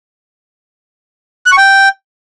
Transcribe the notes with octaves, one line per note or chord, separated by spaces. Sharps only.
F#6
C#6
G5